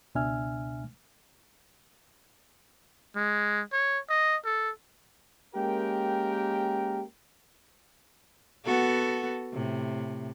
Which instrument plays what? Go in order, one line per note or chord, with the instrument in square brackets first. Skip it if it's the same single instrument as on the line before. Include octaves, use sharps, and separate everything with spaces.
[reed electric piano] C#2 B2 D4 E5 G#5 F6
[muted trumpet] G#3
C#5
D#5
A4
[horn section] G#3 A#3 C#4 G4 A#4 G5
[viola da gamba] B3 F#4 A4
A2 C3